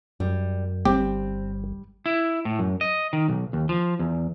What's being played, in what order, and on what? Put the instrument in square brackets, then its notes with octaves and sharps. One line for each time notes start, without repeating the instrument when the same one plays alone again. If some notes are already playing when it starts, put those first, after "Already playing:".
[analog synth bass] F#2 [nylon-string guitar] G3
[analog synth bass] G1 [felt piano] G3 [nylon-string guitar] C4 [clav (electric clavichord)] G4
[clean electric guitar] E4
A2
F#2
D#5
D#3
B1
D#2
F3
E2